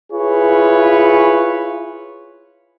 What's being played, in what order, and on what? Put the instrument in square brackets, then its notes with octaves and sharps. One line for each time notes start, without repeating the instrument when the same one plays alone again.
[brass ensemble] E4 F4 G#4 B4 C#5